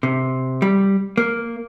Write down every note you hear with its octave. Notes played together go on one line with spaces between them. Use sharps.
C3
G3
A#3